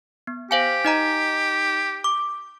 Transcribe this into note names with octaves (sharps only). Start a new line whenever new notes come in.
B3
G4 C5 F5 G#5
D#4 D#5 A#5
D6